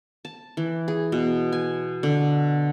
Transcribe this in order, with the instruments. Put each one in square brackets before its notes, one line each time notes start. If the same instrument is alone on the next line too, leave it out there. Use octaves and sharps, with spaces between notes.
[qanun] A5
E3
G#4
B2
G#5
D3